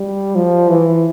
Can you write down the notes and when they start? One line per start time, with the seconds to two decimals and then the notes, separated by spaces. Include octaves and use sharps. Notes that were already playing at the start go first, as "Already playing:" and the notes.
Already playing: G3
0.36 F3
0.70 E3